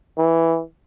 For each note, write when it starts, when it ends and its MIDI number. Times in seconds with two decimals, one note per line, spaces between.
0.18 0.61 52